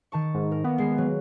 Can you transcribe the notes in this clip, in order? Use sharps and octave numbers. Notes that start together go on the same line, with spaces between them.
D#3 A5 C#6
G#2
A#4
A#3 B3
G#3 C7
F#3